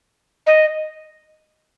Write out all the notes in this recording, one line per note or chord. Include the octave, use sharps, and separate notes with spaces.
D#5